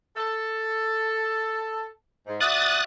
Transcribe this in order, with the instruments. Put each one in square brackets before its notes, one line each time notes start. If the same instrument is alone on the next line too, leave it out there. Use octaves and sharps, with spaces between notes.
[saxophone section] A4
G#2
[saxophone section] F#4 D5 E5 [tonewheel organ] D#6 F#6 A6